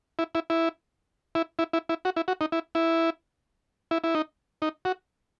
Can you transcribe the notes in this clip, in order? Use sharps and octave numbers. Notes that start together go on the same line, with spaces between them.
E4
E4
E4
E4
E4
E4
E4
F#4
E4
F#4
D#4
E4
E4
E4
E4
D#4
D#4
F#4